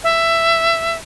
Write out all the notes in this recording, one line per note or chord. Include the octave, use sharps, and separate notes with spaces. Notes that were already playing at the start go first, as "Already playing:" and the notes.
E5